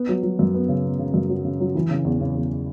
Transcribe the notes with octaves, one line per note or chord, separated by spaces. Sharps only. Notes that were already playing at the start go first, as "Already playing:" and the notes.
Already playing: B3
F#3
F#3
F#2
B3
C#3
B3
C#3
F#2
F#3
C#3
F#3
E3
C#3
E2
C#3
E2